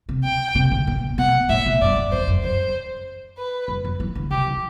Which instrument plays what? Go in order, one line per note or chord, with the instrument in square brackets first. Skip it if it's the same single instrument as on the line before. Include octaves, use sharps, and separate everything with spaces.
[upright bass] C3
[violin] G5
[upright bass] C3
D3
B2
[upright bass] B2 [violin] F#5
[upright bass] A2 [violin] E5
[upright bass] B2
[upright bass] G2 [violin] D5
[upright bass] F#2
[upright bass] E2 [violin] C5
[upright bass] F#2
[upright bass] F#2 [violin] C5
[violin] B4
[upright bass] F#2
F#2
E3
D3
[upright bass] C3 [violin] G4
[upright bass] E3